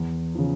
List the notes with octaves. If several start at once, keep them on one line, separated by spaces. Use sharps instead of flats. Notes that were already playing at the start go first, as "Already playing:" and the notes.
Already playing: E2
C#3 F3